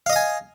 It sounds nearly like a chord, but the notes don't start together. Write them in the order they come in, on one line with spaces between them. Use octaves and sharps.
F5 D#5 D#6 G#5